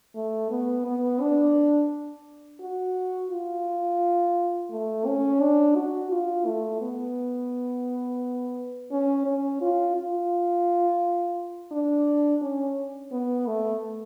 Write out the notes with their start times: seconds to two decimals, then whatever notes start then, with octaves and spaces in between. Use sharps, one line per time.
0.15 A3
0.50 B3
0.86 B3
1.21 D4
2.61 F#4
3.31 F4
4.71 A3
5.06 C#4
5.41 D4
5.76 F#4
6.11 F4
6.46 A3
6.81 B3
8.91 C#4
9.26 C#4
9.61 F4
9.96 F4
11.72 D4
12.41 C#4
13.12 B3
13.47 A3